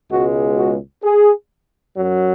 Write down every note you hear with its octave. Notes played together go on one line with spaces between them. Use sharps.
C#2 B2 G#3 F#4
F#4
G#4
F#2 F#3